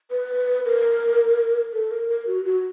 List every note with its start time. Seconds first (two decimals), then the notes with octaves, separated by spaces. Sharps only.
0.11 B4
0.65 A#4
1.73 A4
1.91 A#4
2.09 A#4
2.27 F#4
2.45 F#4